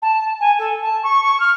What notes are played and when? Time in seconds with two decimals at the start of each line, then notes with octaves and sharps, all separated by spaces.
0.02 A5
0.40 G#5
0.58 A4
0.82 A5
1.03 C#6
1.23 C#6
1.40 F6